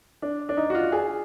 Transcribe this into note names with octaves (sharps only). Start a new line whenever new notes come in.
D4
D4
D#4
F#4
F4
G#4